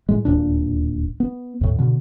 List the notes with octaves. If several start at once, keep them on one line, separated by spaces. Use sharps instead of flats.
A2 G#3
D1 D#2 A#2 D4
B3
D#2 A2
B2 D3